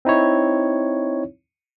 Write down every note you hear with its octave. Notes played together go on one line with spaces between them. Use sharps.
C4 D#4 E4 C#5